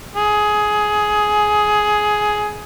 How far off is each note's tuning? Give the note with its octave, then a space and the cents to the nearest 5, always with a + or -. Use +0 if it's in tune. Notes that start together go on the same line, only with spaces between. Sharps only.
G#4 +15